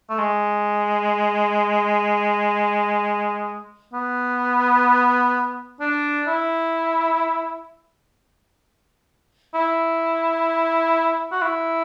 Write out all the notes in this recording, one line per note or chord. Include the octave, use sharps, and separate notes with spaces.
A3
G#3
B3
D4
E4
E4
F#4
E4